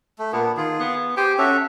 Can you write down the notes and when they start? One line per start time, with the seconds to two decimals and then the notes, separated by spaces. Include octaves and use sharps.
0.19 A3
0.33 A#2 B3 D4
0.57 D#3 F4 G#4
0.79 B3
1.17 G4 C5 G5 G#5
1.38 C#4 F#4 A4 E5